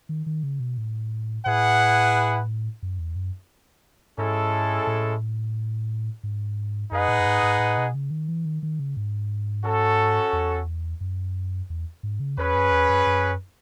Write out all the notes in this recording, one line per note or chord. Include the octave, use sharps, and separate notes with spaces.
D#3
D#3
C#3
B2
A2
A2 E4 G#4 B4 F#5
F#2
E2
F#2
G#2 G#3 C#4 E4 A4
A2
G#2
F#2 D#4 G#4 B4 D#5 F#5
A2
F#2
G#2
G#2
A2
B2
C#3
D#3
E3
D#3
D#3
C#3
G#2
C#4 F#4 A4
E2
F#2
E2
G#2
C#3
E2 C#4 G#4 B4
F#2
E2
F#2
F#2